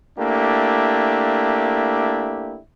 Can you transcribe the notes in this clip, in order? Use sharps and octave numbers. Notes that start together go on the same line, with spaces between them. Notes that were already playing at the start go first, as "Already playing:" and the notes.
A3 A#3 D4 E4 G4